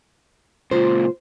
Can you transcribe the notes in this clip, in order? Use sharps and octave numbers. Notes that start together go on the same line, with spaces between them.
C#2 A#2 F4 C5